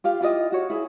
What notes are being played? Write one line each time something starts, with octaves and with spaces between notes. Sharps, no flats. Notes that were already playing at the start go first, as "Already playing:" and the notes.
F4 G4 F5
E4 F4 G4 D#5
F#4 C#5
E4 G#4